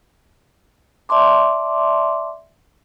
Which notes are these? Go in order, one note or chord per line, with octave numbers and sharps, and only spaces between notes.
D5 E5 A5 C6 D6